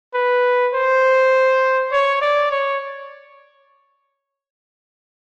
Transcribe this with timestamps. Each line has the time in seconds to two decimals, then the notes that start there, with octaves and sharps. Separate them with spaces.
0.14 B4
0.74 C5
1.92 C#5
2.21 D5
2.51 C#5